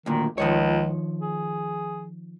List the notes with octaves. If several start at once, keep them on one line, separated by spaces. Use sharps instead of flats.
D2 A#2 D#3
C#2 D#3 F3 C#5
G#4